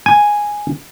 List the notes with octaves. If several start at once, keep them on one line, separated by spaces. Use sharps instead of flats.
G#5